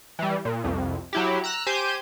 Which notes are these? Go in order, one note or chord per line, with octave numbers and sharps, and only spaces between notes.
E3 G3
A#2
C2 F2
F#3 E4 G4
A#5 E6 F#6
G4 C5 G#5 G6 D#7